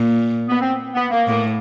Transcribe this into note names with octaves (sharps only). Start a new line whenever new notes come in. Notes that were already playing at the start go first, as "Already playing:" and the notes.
Already playing: A#2
B3
C4
B3
A#3
A2 A#3